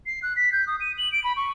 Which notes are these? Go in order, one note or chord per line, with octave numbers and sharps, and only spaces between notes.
C7
F#6
B6
G6
D#6
D#7
F#7
D7
B5
C#6